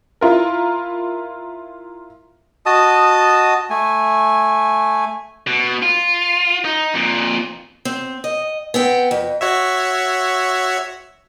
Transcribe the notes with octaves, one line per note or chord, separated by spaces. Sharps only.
E4 F4 A#4
F#4 D#5 A5 D#6
A3 G#5
B2
F4
D#4
F2 A#2
C4
D#5
B3 C4 G5
F2
F#4 C#5 E5